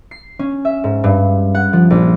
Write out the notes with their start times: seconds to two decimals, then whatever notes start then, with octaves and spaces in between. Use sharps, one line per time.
0.11 C7
0.39 C#4
0.65 E5
0.84 G#2
1.04 G2
1.55 F#5
1.73 F3
1.90 A#1